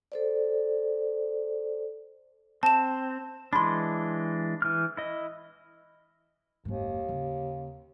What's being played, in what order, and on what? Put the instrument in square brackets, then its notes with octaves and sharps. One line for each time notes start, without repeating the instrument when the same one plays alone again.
[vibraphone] A4 C5 D5
[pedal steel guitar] C4 [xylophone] A5 E7
[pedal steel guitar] E3 G#3 D4 [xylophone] B5 C6
[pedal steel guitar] E3 F6
E4 D#5
[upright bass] F#1 G#2 [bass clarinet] D#2
[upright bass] C#3